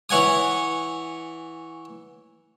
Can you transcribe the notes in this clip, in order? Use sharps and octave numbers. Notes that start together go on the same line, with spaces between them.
E3 C#5 F#5 G#5 D#6